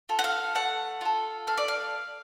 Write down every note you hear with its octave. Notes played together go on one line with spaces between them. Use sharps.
F4 A4
F#5
F5
A3 F#5
F4 A4
A3 F5
D5
F5